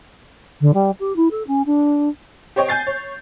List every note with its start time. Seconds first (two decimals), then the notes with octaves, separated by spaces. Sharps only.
0.61 D3
0.74 G3
1.00 G4
1.16 E4
1.31 A4
1.47 C#4
1.66 D4
2.56 G4 C5 C#5 D#5 G5
2.68 G#5 G6 A6 C7
2.87 C#5